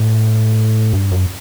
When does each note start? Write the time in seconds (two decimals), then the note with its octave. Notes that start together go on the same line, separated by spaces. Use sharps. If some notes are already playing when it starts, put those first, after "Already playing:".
Already playing: A2
0.93 G2
1.12 F#2